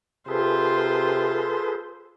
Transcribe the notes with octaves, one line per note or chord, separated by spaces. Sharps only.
C3 F4 G#4 A4 B4 C5